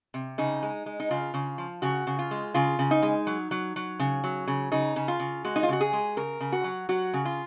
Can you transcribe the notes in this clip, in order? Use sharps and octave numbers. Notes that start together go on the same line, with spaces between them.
C3
C#3 D#4
G#3
G#3
D#4
C#3 F4
C#3
F3
C#3 F#4
C#3
F4
G#3
C#3 F4
C#3
D#4
G#3
F#3
F#3
F#3
C#3
F#3
C#3
C#3 D#4
C#3
F4
C#3
G#3 F#4
D#4
F4
C#3 F#4
G#4
G#3
C#3 A#4
C#3
F#4
F#3
F#3 F#4
C#3
F4